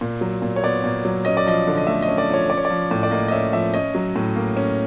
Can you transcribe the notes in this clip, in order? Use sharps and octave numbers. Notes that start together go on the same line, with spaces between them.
A#2
F#3
A#2
C#5
B3 D5
A#2
F#3
C#4 D#5
D5
F3 D#5
D3
D#5
A3 E5
D#5
C#4
D5
F3 C#5
C#4 D5
C#5
D5
F3
A2
D5
A#3 D#5
D#5
C#4 E5
F3 E5
C#4 D#5
F#3
A2
A#3
C#4